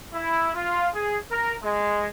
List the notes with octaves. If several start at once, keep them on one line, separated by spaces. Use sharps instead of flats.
E4
F4
G#4
A#4
G#3